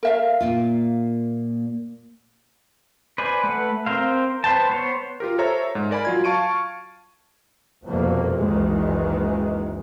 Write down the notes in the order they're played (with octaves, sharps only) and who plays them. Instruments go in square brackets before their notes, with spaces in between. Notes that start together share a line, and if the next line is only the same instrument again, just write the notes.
[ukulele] A#4 E5 F5
[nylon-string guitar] A#2 A#3 F4
[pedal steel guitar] B4 C5 D5 G#5
A3 B4 F#5
C4 A#4 C5 F5
B4 C5 G5 A5
B3 C5 C#5
[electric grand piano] F4 G4 A#4
A4 C5 C#5 E5 A#5
G#2
A#4 D5 G#5 B5
F#3 F4 G#6
F5 A5 C#6 D7 D#7
[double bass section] F#1 C2 F2 B2 A3 A#3
F#1 C#2 D#3 E3 G#3